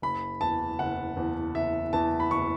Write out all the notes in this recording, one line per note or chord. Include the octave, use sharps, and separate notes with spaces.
F#1 B5
E2 E3 A5
F#1 F#5
E2 E3
F#1 E5
E2 E3 A5
B5
F#1 C#6